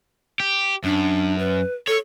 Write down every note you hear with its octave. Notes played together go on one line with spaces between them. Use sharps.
G4
F#2 D4
B4
A4 C#5